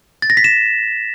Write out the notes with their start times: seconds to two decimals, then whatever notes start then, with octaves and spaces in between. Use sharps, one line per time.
0.22 A6
0.30 A#6
0.37 B6
0.44 E7